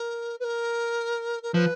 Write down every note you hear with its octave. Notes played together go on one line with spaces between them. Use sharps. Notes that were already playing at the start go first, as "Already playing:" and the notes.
Already playing: A#4
B4
A#4
A#4
F3 B4